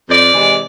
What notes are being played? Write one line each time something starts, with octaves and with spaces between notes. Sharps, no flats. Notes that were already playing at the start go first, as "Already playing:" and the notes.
F2 D5
C3 E3 G#3